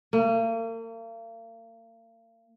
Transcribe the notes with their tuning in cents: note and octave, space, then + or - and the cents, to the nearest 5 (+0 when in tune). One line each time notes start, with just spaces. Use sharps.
A#3 -40